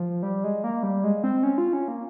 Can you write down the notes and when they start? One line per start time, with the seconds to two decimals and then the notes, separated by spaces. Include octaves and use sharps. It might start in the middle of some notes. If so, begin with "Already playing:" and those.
Already playing: F3
0.23 G3
0.44 G#3
0.64 A#3
0.83 G3
1.04 G#3
1.24 C4
1.43 C#4
1.58 F4
1.73 C#4
1.88 A#3